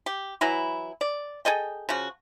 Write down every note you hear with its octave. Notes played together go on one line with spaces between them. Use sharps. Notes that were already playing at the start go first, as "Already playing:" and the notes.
G4
E3 F#3 E4
D5
G#4 A4 D#5 G5
C#3 F3 F#4